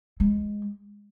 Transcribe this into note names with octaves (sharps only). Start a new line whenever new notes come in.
G#3